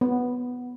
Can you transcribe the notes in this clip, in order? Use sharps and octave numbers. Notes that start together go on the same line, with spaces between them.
B3